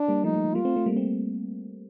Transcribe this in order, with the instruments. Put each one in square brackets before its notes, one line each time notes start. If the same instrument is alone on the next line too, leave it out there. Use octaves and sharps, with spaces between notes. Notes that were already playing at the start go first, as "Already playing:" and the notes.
Already playing: [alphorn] D4
[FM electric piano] G3 A#3
[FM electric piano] F3 A3 [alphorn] D#4
[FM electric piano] F3 A3
F3
[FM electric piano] G3 A#3 [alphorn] F4
[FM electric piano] A3 C4
A3 C4
G3 A#3
A3 C4